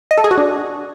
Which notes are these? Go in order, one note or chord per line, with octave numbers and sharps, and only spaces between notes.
D#5
A4
G#4
F#4
D4